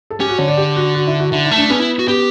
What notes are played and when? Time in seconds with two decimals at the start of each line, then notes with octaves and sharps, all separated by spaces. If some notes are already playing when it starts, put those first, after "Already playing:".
0.10 A4
0.20 C#4 G4
0.29 F#4
0.38 D3 C#5
0.48 D5
0.57 G4
0.76 F#4
0.95 F#4
1.07 E4
1.20 F#4
1.32 D3 E4
1.45 E4
1.51 A3
1.58 D4
1.70 B3 C#4
1.79 E4
1.99 F#4
2.08 B3 G4